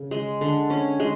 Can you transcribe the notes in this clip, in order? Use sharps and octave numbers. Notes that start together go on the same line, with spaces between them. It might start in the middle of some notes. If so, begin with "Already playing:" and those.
Already playing: C#3
G#3
D3
C#4
G#3